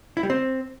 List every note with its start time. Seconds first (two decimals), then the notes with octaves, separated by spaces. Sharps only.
0.17 E4
0.23 G3
0.30 C4